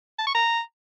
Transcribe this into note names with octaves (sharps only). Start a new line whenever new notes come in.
A5
C#6
A#5